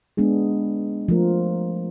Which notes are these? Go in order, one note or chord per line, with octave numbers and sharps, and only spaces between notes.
G#3 B3 D4 G#4
F3 A3 A#4